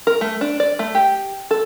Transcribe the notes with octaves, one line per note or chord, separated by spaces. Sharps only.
A#4
A3
D4
D5
A3
G4
A4